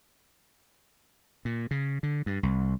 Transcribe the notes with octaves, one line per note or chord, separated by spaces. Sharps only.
A#2
C#3
D3
G2
C2